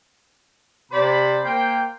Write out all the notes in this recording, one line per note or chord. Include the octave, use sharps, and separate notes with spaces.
C3 C5 D5 B5
A#3 C5 G5